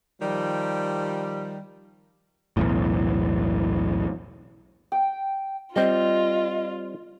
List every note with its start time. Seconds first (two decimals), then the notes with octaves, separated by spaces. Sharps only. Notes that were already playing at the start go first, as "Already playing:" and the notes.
0.21 D#3 F3 G3
2.57 B1 E2 A2
4.92 G5
5.76 G3 C4 F4 D#5